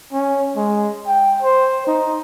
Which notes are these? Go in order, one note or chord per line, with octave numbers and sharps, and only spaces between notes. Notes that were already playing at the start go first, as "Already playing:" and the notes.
C#4
G#3
G5
C5
D#4